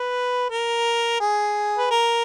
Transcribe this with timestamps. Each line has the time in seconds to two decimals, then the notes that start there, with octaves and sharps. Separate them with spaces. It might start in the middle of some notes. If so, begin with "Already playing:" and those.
Already playing: B4
0.50 A#4
1.20 G#4
1.78 B4
1.91 A#4